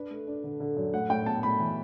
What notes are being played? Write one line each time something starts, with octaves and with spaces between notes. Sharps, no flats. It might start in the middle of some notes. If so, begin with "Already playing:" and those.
Already playing: D4 B4
A3
D4
D3
D3
F#2
A2 F#5
A2 G5
B3 A5
A2 B5
E3